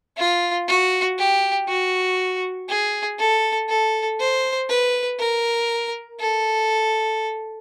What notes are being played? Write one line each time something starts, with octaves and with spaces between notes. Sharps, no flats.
F4
F#4
G4
F#4
G#4
A4
A4
C5
B4
A#4
A4